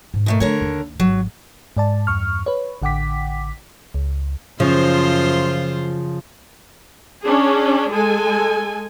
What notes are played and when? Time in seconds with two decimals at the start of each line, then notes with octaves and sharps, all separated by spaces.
0.14 G#2
0.26 B2 A3 A#3
0.40 D3 A3 A#4 C#5
0.61 D#2
1.00 G#1 F#3
1.77 G#2 D5 A5
2.07 E2 G2 C#6 F6
2.46 B4 C#5
2.82 A1 D3 F#5 G5 D6 B6
3.94 C#2
4.60 F#2 C#3 F3 F4 C5
7.24 C#4 D4 G#4
7.92 G#3 A4 G#5